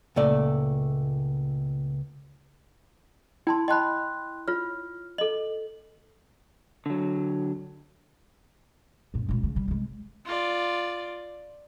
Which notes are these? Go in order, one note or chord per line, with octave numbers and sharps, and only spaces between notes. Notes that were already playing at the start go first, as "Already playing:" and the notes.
C#2 A#2 A3 D5
E4 G5 A5 C6
D#5 G5 A5 B5 C6 F#6
F4 C#5 F6
A4 D#5 F#7
D3 F#3
F#2 A#2
C#2 A#2
C#3 F3
G3
C3 G#3
F4 D5